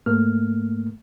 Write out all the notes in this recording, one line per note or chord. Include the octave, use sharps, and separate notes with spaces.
G#2 A3 A#3 F6